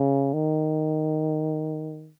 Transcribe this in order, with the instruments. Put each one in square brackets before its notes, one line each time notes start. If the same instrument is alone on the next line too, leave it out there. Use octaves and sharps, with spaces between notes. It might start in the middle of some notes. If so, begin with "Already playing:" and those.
Already playing: [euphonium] C#3
D#3